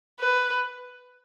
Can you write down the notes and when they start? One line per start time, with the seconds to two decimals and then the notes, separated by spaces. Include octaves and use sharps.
0.20 B4